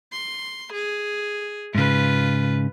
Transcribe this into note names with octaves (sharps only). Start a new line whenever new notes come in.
C6
G#4
G#2 C#3 F4 B4